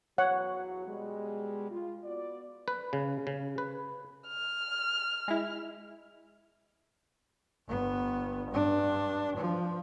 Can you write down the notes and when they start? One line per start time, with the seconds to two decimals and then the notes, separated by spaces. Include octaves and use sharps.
0.18 E2 F#3 C#5 F#5
0.87 B2 G3 G#3
1.70 F4
2.04 B3 F#4 D5
2.68 B4
2.93 C#3
3.27 C#3
3.58 B4
4.28 F6
5.28 G#3 E4
7.68 G1 B3
8.50 G2 D4
9.36 F3